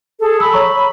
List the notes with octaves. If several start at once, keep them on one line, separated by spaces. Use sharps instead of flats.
G#4 A4
B5 E6
C#5 A#5 C#6